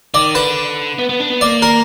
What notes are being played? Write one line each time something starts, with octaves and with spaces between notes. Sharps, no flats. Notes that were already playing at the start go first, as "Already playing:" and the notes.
D#3 D5
D3 B4
B3
B3
D4
B3
A#3 D5
A#4